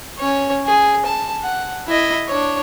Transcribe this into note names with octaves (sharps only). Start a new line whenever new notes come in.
C#4 C#5
G#4
A5
F#5
E4 D#5
D4 C#5